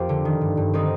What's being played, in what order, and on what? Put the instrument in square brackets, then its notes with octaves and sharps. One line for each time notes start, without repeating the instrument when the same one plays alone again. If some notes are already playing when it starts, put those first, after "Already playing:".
Already playing: [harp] F2 C4 F4 G4 A#4 C5
D3
D#3
G2
G2
D#3 C4 D#4